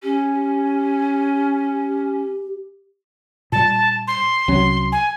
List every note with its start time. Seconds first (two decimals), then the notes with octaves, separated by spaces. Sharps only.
0.03 C#4 G4
3.52 A#2 G3 A5
4.08 C6
4.48 C2 F#3 C#4
4.92 G#5